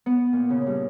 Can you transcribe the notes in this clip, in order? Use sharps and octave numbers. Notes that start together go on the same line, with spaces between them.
B3
A#2
C#3
G2